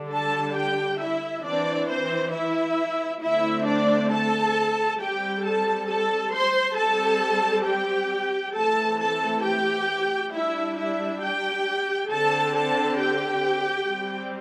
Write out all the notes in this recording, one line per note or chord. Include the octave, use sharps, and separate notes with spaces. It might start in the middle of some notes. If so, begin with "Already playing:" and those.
Already playing: D3 G3 D4
A4 A5
G4 G5
E4 E5
E3 C4 D4 D5
C4 C5
E4 E5
D3 A3 C4 E4 E5
D4 D5
A4 A5
G3 C4 G4 G5
A4 A5
A4 A5
C5 C6
G3 C4 A4 A5
G4 G5
E3 A3 C4 A4 A5
A4 A5
G4 G5
G3 D4 E4 E5
E4 E5
G4 G5
D3 C4 A4 A5
A4 A5
G4 G5
G3 C4